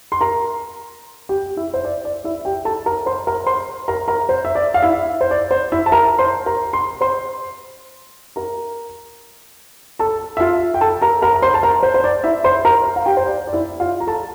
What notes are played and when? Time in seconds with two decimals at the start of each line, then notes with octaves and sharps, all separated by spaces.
0.12 C6
0.21 A#4 A#5
1.29 G4 G5
1.57 E4 E5
1.74 C5
1.84 D5
2.05 D5
2.24 E4 E5
2.45 G4 G5
2.65 A4 A5
2.86 A#4 A#5
3.06 C5 C6
3.27 A#4 A#5
3.47 C5 C6
3.88 A#4 A#5
4.08 A#4 A#5
4.29 C5
4.45 E5
4.55 D5
4.74 F5
4.82 E4 E5
5.21 C5
5.31 D5
5.51 C5
5.72 E4 E5
5.86 A5
5.92 A#4 A#5
6.18 C5 C6
6.46 A#4 A#5
6.73 C6
7.01 C5 C6
8.36 A#4 A#5
9.99 A4 A5
10.37 E5
10.40 F4 F5
10.74 G5
10.81 A4 A5
11.02 A#4 A#5
11.22 A#4 A#5
11.33 A#5
11.42 C5 C6
11.54 A5
11.63 A#4 A#5
11.83 C5
11.94 C5
12.04 D5
12.24 E4 E5
12.44 C5 C6
12.65 A#4 A#5
12.96 F5
13.06 G4 G5
13.17 C5
13.27 D5
13.47 D5
13.53 E4 E5
13.80 F4 F5
14.00 A#5
14.07 A4 A5